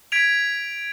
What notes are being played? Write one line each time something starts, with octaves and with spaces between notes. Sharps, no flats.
G#6 B6 D7 F7